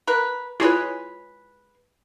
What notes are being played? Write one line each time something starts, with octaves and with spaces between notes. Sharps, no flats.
A#4 B4
G#3 E4 F4 G#4 B4 C#5